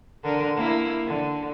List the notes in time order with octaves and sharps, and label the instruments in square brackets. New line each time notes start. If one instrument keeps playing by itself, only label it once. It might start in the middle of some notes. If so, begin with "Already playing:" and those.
[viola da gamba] D3 A#4
A#3 E4
D3